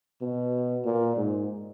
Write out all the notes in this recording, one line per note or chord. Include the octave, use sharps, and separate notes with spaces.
B2
A#2
G#2